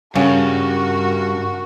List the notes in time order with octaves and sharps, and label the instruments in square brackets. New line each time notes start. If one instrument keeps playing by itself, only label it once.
[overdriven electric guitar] G2 [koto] C#3 [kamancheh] F#4 A#4